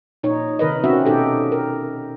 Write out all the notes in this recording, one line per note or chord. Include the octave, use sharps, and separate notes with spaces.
A#2 D#4 C#5
C3 D#3 A#4 B4 D#5
C4 C#4 F#4 E5
B2 D#4 G4 A4
A#4